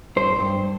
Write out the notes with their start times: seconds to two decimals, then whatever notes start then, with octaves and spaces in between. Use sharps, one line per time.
0.16 G2 C5
0.40 G2